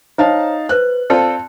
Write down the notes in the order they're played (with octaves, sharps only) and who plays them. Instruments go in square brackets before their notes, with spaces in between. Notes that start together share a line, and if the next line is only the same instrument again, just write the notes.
[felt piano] D#4 F5 A5 [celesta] C5 C#5 A#5
[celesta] B4 C5 [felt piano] F#6
[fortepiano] C4 F4 A4 [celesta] D5 A5